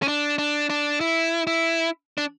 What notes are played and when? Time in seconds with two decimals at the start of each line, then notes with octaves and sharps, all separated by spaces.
0.02 C#4
0.08 D4
0.38 D4
0.70 D4
1.01 E4
1.47 E4
2.18 D4